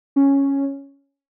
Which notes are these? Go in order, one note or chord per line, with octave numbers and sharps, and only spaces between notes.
C#4